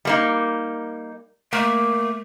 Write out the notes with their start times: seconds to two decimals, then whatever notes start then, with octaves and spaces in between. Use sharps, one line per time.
0.05 G3 A#3 D#4
1.53 A3 A#3